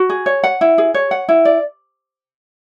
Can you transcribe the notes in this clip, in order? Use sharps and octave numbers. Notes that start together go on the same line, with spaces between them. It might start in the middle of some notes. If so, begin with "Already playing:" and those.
Already playing: F#4
G#4
C#5
F#5
E4
G#4
C#5
F#5
E4
D5